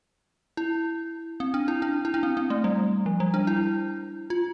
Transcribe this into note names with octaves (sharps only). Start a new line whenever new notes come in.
E4
C4
D4
E4
D4
E4
D4
C4
C4
A3
G3
F3
G3
D4
E4
F4